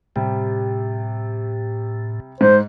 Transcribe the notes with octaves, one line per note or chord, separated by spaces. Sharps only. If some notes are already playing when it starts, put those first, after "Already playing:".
A2 C3 G3
G#2 C5